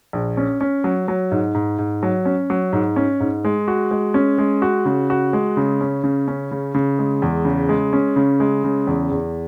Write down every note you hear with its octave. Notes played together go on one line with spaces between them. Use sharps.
A#1
C#4
C#4
F#3
F#3
G#2
G#2
G#2
F#3
C#4
F#3
G#2
C#4
G#2
G#3
F#4
G#3
C#4
G#3
F#4
C#3
F#4
G#3
C#3
C#4
C#3
C#4
C#3
C#3
G#3
E2
C#3
G#3
C#4
C#3
G#3
C#3
E2
E2